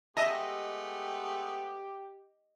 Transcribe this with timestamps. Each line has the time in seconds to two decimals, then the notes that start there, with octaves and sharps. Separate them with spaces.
0.17 G#3 A3 B3 G4 D#5 E5 A5 A#5